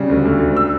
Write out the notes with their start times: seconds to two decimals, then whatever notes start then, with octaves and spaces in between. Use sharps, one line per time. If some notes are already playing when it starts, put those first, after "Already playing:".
Already playing: C#3 G3
0.09 D2
0.25 D2
0.40 D2
0.57 E6